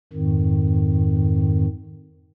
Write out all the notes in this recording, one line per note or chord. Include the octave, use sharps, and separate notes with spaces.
F2 G#2 D#3